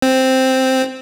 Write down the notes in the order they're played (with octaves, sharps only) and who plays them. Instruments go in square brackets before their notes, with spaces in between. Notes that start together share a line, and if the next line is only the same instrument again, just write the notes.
[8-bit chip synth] C4